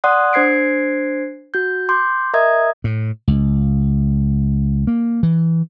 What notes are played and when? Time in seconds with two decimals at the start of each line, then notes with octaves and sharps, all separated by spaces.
0.04 D5 F#5 C6 D#6 F#6
0.33 D4 C5 G#6 C7 D7
1.54 F#4 G6
1.89 C6 D6 G6
2.33 A#4 D#5 E5 A#5 D#6 G#6
2.84 A2
3.28 C#2
4.87 A#3
5.23 E3